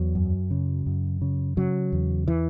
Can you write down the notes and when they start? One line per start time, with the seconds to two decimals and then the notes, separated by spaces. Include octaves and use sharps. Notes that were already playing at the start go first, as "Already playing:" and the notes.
Already playing: E2 F#3
0.15 F#2
0.51 C#3
0.86 F#2
1.22 C#3
1.57 C#3 F#3
1.92 E2
2.28 E3